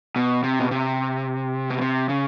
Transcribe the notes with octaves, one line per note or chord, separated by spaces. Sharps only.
B2
C3
B2
C3
B2
C3
C#3